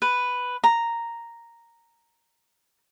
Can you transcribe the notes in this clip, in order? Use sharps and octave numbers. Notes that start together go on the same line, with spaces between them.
B4
A#5